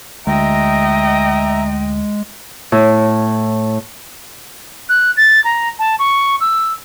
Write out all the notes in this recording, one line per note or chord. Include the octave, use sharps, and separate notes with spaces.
D2 G#3 D#5 E5 G5 A#5
A2
F#6
A6
A#5
A5
C#6
E6